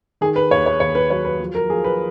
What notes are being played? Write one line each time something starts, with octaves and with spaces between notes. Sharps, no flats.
D#3 G#4
B4
D#2 C#5
C#5
D#2 C#5
B4
F#3 C#5
B4
F3
A#4
F3 G#4
B4